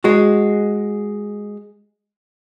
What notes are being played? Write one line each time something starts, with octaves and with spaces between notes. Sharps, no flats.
G#3 F#4